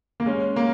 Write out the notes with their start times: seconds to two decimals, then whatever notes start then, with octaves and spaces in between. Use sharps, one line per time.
0.20 A#3
0.26 G#3 C#4
0.56 A#3